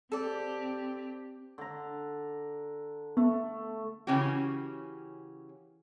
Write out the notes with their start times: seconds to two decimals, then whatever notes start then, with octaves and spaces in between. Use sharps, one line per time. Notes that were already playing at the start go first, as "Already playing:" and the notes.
0.12 C4 G4 A4 D5
1.58 D3 A#5
3.17 A3 B3
4.07 C#3 E3 C#4 F#4 G4